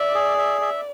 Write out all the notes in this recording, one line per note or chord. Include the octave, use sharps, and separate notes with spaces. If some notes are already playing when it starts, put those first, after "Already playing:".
Already playing: D5 E5
G#4
E5
E5